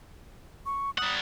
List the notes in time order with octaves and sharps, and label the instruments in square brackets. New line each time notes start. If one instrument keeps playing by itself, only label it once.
[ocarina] C#6
[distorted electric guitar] G3 F#5 [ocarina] D#6